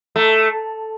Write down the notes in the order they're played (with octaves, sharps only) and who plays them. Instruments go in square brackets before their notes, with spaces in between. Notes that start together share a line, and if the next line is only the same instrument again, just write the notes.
[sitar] A3